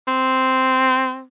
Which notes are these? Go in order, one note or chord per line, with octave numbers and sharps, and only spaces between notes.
C4